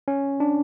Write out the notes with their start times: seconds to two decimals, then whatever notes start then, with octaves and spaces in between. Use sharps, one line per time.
0.08 C#4
0.40 D4